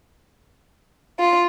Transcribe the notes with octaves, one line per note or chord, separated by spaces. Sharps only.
F4